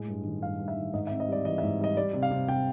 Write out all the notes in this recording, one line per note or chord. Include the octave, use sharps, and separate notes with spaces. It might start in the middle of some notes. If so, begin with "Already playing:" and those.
Already playing: A2 G#3
G2
D#3
G2 F5
G2
E5
D#3
G#2 D#5
E5
C4
D#5
G3 D5
E3 D#5
E5
G#2
G3 D#5
G3 D5
C3
F5
C3
C3 G5